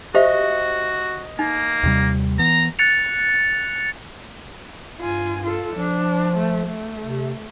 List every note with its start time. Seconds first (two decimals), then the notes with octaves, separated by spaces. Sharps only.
0.15 F#4 G4 C5 D#5 E5
1.39 A#3 D#4
1.83 D#2 C3 G3
2.39 E3 B3 A#5
2.79 F#6 A6 C#7 F7
5.00 G2 F4 G#5
5.43 F4 A4
5.76 F3 D4
6.37 A3
6.66 A3
7.03 C3